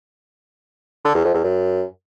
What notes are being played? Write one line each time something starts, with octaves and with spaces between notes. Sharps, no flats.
D3
E2
F2
E2
F#2